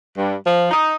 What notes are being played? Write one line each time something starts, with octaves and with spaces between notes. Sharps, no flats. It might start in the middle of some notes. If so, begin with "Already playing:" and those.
G2
F3
D#4